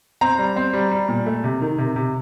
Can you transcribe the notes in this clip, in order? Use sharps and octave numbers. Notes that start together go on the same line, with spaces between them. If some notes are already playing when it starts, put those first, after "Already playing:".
C4 A#5
G3
C4
G3
G3
A#2
A3
C3
D#3
C3
C3